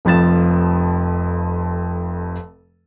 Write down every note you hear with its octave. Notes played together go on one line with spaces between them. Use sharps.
F1 F2 F3 A6 E7